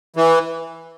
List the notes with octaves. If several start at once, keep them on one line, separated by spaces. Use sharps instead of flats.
E3